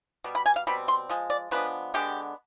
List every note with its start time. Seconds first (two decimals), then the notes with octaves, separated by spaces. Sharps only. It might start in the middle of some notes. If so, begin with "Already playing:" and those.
0.24 B2 G3
0.35 B5
0.46 G#5
0.56 F5
0.67 B2 G3 C4 B5
0.88 C6
1.10 F3 G#3
1.30 D5
1.51 F3 G#3 B3 D4 B4
1.94 D3 G#3 B3 D4 G4